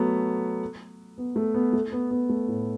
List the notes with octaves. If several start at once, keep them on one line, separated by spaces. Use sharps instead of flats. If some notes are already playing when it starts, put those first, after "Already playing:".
Already playing: F#3 A3 B3
B3
A3
B3
A3
B3
B3
A3
A2